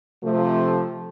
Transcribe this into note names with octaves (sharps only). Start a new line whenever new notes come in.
C3 F3 A3